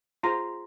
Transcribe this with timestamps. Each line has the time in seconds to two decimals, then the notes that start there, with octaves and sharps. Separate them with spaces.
0.23 F4 G#4 C5 A#5 C6